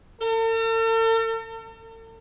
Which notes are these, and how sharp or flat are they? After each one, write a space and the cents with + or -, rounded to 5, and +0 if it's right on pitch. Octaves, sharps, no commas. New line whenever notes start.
A4 +45